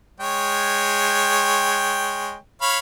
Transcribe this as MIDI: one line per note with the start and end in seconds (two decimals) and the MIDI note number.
0.20 2.36 56
0.20 2.36 73
0.20 2.36 79
2.62 2.79 73
2.62 2.79 77
2.62 2.79 83